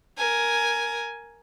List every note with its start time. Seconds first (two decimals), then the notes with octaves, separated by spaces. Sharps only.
0.18 A#4 G#5